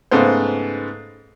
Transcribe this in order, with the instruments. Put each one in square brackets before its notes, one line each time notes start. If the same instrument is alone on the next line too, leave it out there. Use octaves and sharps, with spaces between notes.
[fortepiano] G#2 C#3 A3 B3 C5